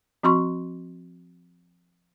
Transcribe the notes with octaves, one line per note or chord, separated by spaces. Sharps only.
F3 C4 F#4 C6 C#6